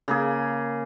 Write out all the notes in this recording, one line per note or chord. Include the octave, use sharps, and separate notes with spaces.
C#3 A#3 G#4